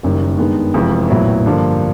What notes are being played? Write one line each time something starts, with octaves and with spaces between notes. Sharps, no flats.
F#1 F#2 D#3 G3 A#3
G2 D#3 G#3 B3
F1 F2 C3 E3 G#3
A#1 A2 F#3 B3 E4
G2 D3 F3 A#3